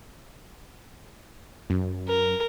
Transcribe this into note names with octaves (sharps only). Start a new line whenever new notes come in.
F#2
A#4